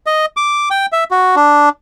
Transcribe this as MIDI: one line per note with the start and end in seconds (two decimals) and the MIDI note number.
0.06 0.26 75
0.37 0.69 86
0.71 0.86 79
0.92 1.04 76
1.11 1.35 66
1.36 1.69 62